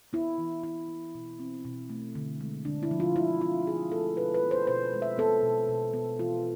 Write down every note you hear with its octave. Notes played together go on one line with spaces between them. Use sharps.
B3 E4
E3
E3 E4
B3
B2
C4
B2
A3
D3
G#3
D3 D4
E4
F3
F4
D3 E4
C4 F4
D3 G#4
A3 A4
B2 B4
B4
B3
C5
B2 C5
G#3
E5
B3 A4
B2
B2
B3
E3 F4